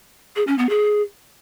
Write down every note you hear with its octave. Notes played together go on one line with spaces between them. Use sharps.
G#4
C#4
B3
G#4